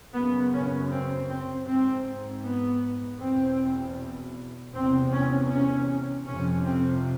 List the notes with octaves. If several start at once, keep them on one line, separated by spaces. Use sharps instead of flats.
F#2 C#3 B3
C#4
C4
C4
G#2 C4
B3
E2 B2 C4
E2 C3 C4
C#4
C#4
F2 C3 C#4
C4